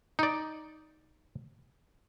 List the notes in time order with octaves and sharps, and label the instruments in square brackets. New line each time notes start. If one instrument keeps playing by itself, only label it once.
[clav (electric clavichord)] D#4 D5